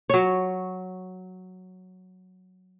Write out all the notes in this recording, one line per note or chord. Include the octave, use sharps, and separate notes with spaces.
F#3 C#5